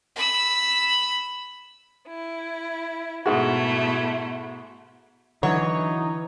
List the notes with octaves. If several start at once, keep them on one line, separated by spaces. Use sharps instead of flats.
B5 E6
E4
G#2 B2 G#3 A3 E4 F#4
D3 E3 F#3 D#4 C#5